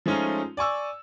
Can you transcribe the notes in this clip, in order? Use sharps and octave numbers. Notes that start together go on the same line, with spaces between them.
F3 G#3 A3 C#4 D#4 F4
D5 G#5 C#6 E6